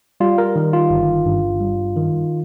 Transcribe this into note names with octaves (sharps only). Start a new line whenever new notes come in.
G3 F4
A#4
D#3
F4
G1
G2
G3
D#3